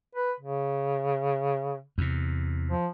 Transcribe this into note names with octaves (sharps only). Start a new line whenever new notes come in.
B4
C#3
E2 C3
F3